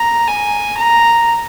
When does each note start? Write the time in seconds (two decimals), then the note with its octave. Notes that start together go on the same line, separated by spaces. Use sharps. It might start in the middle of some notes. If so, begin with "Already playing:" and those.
Already playing: A#5
0.28 G#5
0.78 A#5